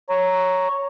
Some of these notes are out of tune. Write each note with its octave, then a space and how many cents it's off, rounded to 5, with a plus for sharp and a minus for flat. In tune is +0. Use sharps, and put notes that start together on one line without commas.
C#5 +0 A#5 +0